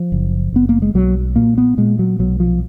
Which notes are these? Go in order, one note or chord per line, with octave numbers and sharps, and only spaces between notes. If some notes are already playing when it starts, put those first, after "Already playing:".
Already playing: F3
F#1
F#1 B3
A#3
G#3
B1 F#3
A#2 A#3
B3
A#2 G#3
F#3
B1 F#3
F3